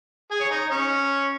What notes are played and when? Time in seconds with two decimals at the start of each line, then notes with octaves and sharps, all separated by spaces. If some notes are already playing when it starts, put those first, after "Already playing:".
0.31 G#4 G#5
0.40 C#5
0.51 D#4 D#5
0.70 C#4 C#5